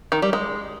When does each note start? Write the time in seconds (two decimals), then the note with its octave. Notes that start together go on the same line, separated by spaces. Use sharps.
0.12 D#3
0.22 G3
0.33 G#3